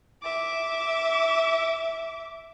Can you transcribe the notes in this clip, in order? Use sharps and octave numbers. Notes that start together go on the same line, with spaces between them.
E5 D6